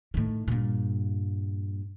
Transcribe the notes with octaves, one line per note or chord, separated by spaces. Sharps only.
A2 D#3
G2 A#2